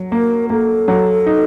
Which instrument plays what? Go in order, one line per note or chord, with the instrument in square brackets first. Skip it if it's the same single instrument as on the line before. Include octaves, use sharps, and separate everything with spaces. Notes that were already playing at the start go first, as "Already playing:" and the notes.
Already playing: [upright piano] F#3
[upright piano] A#3 [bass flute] A#4
[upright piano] A#3 [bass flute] A4
[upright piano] F#3
D#4